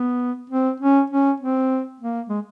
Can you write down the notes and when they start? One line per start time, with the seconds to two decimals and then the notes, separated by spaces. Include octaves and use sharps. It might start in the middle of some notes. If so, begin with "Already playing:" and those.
Already playing: B3
0.50 C4
0.80 C#4
1.10 C#4
1.40 C4
2.00 A#3
2.29 G#3